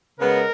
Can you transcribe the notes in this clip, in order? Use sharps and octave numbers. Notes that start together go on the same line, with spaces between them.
C#3 G#3 B3 A#4